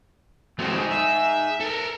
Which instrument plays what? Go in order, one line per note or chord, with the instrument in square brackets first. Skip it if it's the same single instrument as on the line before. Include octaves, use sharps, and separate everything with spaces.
[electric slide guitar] C3 G#3 A3 [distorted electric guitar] F#3 C4
[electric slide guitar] D#4 G#4
[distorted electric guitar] E5
A4 A#4